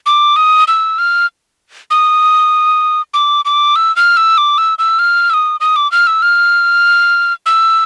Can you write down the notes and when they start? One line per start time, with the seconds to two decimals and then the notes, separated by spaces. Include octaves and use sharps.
0.06 D6
0.36 D#6
0.68 E6
0.98 F6
1.91 D#6
3.14 D6
3.45 D6
3.76 E6
3.96 F6
4.17 E6
4.38 D6
4.58 E6
4.79 E6
4.99 F6
5.30 E6
5.34 D#6
5.60 D#6
5.76 D6
5.92 F6
6.07 E6
6.22 F6
7.46 E6